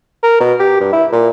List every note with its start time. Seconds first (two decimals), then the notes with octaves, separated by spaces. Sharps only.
0.23 A#4
0.40 B2
0.60 G4
0.81 G2
0.93 E4
1.12 A#2